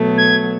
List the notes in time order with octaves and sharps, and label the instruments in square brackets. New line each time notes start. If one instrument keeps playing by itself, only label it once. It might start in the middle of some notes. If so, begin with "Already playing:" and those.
Already playing: [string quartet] B2 F#3 A3
[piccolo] G#6